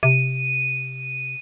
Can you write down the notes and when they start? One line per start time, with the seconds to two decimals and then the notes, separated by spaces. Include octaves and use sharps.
0.03 C3 D#7